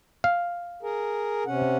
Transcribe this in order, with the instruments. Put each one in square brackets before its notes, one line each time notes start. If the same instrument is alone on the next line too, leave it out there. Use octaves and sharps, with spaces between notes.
[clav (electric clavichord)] F5
[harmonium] G#4 A#4
C3 C#4 F#5